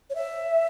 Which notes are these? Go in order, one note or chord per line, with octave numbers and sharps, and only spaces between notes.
C#5
E5